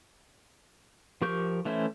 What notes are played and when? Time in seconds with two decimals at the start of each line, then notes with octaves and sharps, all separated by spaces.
1.22 F3 G4 A#4 C#6 G6
1.65 E3 A3 C#4 E4 C5